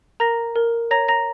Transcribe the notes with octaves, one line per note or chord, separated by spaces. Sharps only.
A#4 A#5 A#6
A#4
C#5 A#5 A#6
A#5 A#6